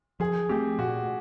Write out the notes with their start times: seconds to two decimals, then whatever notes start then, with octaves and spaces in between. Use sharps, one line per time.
0.20 F3 G#4
0.49 A3 C4 G4
0.78 A#2 F#4